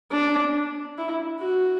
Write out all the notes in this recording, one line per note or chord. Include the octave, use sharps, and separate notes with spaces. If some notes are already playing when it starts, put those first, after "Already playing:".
D4
E4
F#4